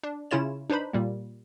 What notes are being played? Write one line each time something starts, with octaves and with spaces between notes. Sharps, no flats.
D4
C#3 C#4 E4 F4 C#5 E7
D4 D#4 B4 C5 B5
A#2 G3 A#3